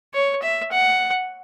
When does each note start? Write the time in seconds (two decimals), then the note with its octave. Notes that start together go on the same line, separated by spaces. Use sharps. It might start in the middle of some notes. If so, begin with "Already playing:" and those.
0.14 C#5
0.42 E5
0.72 F#5